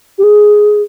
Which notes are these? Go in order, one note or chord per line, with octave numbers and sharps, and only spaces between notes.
G4
G#4